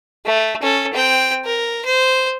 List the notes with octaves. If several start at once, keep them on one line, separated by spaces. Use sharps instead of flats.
A3
C#4 A4
C4 G5
A#4
C5